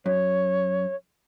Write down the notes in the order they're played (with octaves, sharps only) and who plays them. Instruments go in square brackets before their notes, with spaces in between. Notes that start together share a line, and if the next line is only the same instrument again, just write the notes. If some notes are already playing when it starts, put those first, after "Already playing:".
[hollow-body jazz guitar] F#2 [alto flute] C#5